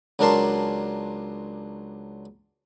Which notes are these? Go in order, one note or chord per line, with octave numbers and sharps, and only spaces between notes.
C#2 F#3 D4 A#4 A5 C6